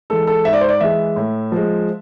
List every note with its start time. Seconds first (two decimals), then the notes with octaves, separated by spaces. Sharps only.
0.10 E3 G#3 A4
0.27 A4
0.45 G#2 E5
0.53 D5
0.61 C5
0.69 D5
0.80 E3 G#3 E5
1.16 A2
1.52 F3 G#3